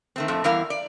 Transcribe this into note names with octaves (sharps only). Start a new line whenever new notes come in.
D#3 A3 C4
F2 A2 A3
E2 G3 E4 A#4 F5
D5